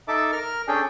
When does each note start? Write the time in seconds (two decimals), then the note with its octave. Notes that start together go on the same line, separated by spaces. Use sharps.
0.08 D#4 A4 E5 A5 D6
0.32 A#4 F6
0.68 C#4 D4 G#4 A4 G5